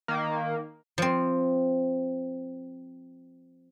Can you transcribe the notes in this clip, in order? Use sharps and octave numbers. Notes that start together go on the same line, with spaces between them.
D#3 A#3
F3 C4